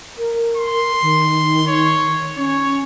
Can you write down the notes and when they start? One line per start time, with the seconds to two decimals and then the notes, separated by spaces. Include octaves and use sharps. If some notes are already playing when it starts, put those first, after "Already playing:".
0.18 A#4
0.57 C6
1.02 D#3
1.68 C#5
2.37 C#4 C#5